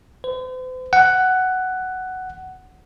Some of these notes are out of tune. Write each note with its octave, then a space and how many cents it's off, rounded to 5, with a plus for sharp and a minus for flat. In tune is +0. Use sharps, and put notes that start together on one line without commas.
C5 -45
F#5 +10